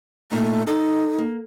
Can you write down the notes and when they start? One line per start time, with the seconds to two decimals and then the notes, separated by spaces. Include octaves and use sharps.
0.32 A#2 A3 D#4
0.67 D#4 A4
1.18 A#3